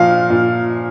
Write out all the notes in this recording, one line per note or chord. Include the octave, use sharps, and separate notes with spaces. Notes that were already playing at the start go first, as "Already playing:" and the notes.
Already playing: A#2 F3 F5
A#2